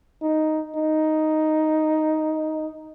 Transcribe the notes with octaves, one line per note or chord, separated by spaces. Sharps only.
D#4
D#4